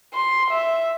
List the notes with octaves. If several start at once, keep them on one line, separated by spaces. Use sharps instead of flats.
C6
E5